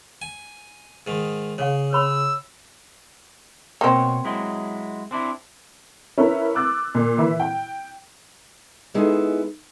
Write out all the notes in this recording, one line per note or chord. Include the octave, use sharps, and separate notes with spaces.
G#5
G#2 D#3
C#3 C#5 F5
C#5 B5 E6
B2 A#3 C4 C#5
F#3 G#3 E4
C4 D4 E4
C#4 E4 A#4 B4
D6 E6 F#6 A6
A#2
E3 E4
G5
G#3 B3 D#4 E4 G#4 A4